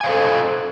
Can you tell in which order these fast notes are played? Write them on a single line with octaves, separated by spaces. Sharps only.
G#5 F5 C5 A4